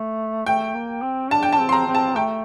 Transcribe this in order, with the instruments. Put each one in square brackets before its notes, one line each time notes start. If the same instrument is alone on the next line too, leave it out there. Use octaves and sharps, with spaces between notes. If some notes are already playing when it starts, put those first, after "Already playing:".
Already playing: [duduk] A3
[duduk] A3 [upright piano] G5
[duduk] A#3
C4
[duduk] D4 [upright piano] A5
[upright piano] G5
A5
[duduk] C4
[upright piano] C6
A#5
[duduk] C4
[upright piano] A5
[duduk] A3 [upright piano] G5